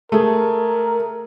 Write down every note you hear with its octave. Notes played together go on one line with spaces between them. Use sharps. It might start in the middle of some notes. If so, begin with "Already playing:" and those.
A3 G#4 A#4